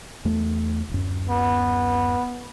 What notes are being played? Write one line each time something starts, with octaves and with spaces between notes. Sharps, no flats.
E2 A3
D1 F#2
B3